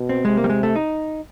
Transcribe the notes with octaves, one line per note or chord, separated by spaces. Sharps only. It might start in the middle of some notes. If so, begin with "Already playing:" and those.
Already playing: B2
C4
C3 G#3
A#3
G3
G#3
A3
D#4